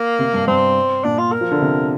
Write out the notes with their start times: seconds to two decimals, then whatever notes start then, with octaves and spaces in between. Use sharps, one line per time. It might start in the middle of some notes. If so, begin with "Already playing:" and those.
Already playing: A#3
0.19 C3
0.33 G2
0.48 G2 C4
1.04 A#2 D4
1.18 F4
1.32 A#4
1.41 F3
1.51 D3
1.62 C3